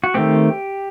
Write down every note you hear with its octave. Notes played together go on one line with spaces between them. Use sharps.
F#4
D#3 A3 C4 G4